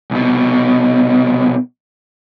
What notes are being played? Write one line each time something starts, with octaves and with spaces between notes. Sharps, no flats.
C2 B2